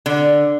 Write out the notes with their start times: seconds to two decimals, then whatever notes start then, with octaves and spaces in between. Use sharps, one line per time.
0.06 D3